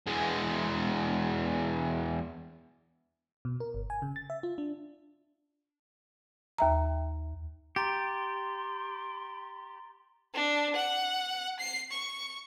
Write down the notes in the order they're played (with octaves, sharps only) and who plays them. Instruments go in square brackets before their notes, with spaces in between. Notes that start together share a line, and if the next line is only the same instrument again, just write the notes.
[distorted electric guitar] E2 G#3
[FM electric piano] B2
A#4
G1
G#5
C#3
A6
E5
F4
D4
[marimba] D#2 E5 A#5
[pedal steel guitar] G4 [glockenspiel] A#5 A6 [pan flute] C6
[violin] D4
F#5
C7
C#6